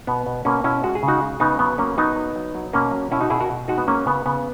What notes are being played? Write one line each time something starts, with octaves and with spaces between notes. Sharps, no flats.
B2 B3
B2
B2 A#3 C#4
B2 C#4 E4
G#3 F#4
G#4
C#3
D#4 F#4
G#3
C#3 B3 D#4
F#3 B3
F#3 A#3 C#4
F#3 B3 D#4
F#3
F#3
F#3
B2 A#3 C#4
F#3
B2 C#4 E4
D#4 F#4
B2 E4 G#4
F#4 A#4
B2
G#3 D#4 F#4
B3
F#3 A#3 C#4
C#3 B3
C#3 B3